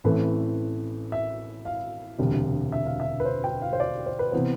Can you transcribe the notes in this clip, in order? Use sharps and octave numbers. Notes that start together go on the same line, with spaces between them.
A1 A2 E3 A3 C4 B4
E5
F5
E1 D2 C3 G3
E5
F5
E5
B4
C5
G5
F5
C5
D5
C5
B4
C3 E3 B3 C5